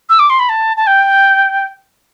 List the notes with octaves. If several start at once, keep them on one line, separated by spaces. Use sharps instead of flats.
E6
D6
C6
B5
A5
A5
G5